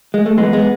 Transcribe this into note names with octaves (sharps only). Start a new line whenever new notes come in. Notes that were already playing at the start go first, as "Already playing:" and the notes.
G#3
A3
F#2 E3 G#3 B3
G#3 B3